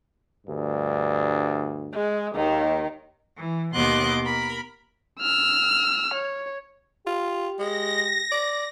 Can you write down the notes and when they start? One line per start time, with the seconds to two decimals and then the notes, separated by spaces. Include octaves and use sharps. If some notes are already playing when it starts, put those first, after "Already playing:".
0.47 D2 G2
1.94 G#3
2.35 D#2 D#3
3.37 E3
3.75 D#2 B2 D#5 C6 D6 F#6
4.25 A#4 B5
5.20 E6 F6
6.14 C#5
7.07 F4 G4
7.59 G#3 A#6
8.31 D5